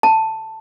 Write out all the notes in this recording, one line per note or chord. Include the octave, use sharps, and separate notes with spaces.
A5